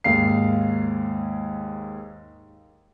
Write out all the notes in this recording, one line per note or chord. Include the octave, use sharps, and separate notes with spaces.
D#2 G#2 F5 C7